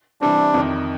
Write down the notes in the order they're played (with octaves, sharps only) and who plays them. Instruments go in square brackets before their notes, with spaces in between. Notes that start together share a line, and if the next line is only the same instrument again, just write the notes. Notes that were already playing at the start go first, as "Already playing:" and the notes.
[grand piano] C3 E3 G3 C4 [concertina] D4
[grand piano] F2 C3 D#3